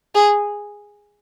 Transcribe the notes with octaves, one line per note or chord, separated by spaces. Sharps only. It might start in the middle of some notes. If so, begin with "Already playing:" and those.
G#4